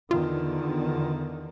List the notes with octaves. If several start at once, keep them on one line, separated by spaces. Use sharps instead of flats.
E2 D3 D#3 F4